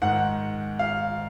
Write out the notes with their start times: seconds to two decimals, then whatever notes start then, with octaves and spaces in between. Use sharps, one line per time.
0.02 G#2 D#3 F#5
0.79 F5